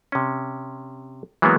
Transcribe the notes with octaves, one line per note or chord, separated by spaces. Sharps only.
C3 C#4
E3 F#3 G#3 A#3 B3